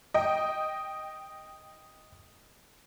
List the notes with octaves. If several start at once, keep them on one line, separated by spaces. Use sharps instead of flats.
D#5 G5